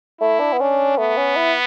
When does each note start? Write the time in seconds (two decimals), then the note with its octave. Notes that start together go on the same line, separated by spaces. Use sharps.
0.20 A3 E4
0.40 D4
0.53 B3
0.59 C#4 D4
0.98 A3 B3
1.17 C#4
1.37 E4